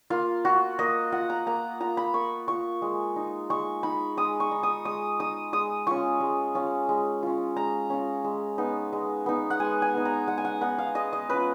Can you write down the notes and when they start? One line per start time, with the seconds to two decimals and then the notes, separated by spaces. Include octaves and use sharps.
0.10 A#3 F4
0.45 F4 F#4
0.79 A#3 D#5
1.12 F4 F#5
1.30 A#5
1.46 A#3 A#5
1.80 F4 A#5
1.97 B5
2.14 A#3 C#6
2.48 F4 C#6
2.82 G#3
3.16 D#4
3.50 G#3 C#6
3.83 D#4 B5
4.17 G#3 D#6
4.40 C#6
4.51 D#4
4.63 D#6
4.85 G#3 D#6
5.20 D#4 D#6
5.53 G#3 D#6
5.87 C#4 F4 C#6
6.21 G#3
6.55 C#4 F4
6.89 G#3
7.23 C#4 F4
7.56 G#3 A#5
7.90 C#4 F4
8.24 G#3
8.58 B3 D#4
8.93 G#3
9.26 B3 D#4
9.50 F#5
9.60 G#3 G#5
9.82 G#5
9.94 B3 D#4
10.05 A#5
10.28 G#3 F#5
10.38 G#5
10.45 F#5
10.61 B3 D#4 F#5
10.78 F5
10.95 G#3 D#5
11.13 D#5
11.29 C#4 F4 B4